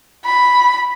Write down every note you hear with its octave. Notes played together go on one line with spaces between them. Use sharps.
B5